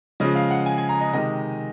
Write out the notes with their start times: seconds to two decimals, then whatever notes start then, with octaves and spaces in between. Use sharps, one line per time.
0.20 C#3 F3 G#3 D#5
0.35 F5
0.51 F#5
0.66 G#5
0.78 G#5
0.89 A#5
1.00 D#5
1.13 C3 D#3 G#3 D#5